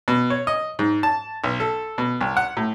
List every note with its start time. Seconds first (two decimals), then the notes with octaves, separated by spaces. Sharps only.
0.08 B2
0.30 C#5
0.47 D#5
0.79 G#2
1.03 A5
1.44 B1
1.60 A4
1.98 B2
2.21 C2
2.37 F#5
2.57 A2